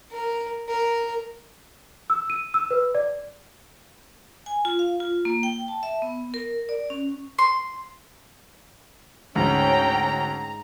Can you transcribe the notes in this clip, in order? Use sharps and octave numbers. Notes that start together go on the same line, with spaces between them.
A#4
A#4
E6
D#7
E6
B4
D5
G#5
F4
F5
F4
A#3
G5
A5
E5
B3
A#4
D5
C#4
C6
D2 G#2 C#4 G5 A#5